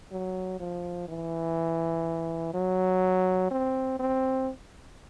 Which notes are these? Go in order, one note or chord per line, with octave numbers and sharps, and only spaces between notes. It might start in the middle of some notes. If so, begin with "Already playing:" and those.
F#3
F3
E3
F#3
C4
C4